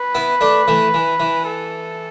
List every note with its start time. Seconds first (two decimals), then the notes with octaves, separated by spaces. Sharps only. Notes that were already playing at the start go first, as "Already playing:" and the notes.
Already playing: B4
0.15 B3 E4
0.41 A3 D4
0.68 E3 A3
0.94 E3
1.20 E3
1.46 A4